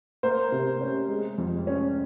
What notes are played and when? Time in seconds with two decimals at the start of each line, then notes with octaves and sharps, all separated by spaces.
0.23 A#3 C5
0.52 C3
0.81 C#4
1.09 G#3
1.38 F2
1.67 C#4